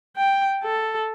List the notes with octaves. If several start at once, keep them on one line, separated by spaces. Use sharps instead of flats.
G5
A4